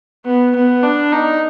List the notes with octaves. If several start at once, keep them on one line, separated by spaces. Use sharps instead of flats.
B3
B3
D4
D#4